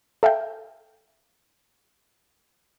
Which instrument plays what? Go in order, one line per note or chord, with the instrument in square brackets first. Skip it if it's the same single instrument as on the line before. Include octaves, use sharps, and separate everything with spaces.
[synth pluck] A4 E5 F5 G5